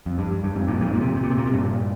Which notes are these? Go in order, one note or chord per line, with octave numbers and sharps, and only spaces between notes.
F2
G2
G2
G2
F2 G#2
G2 A#2
F2 G#2
A#2
C3
A#2
C3
A#2
C3
A#2
C3
G2 A#2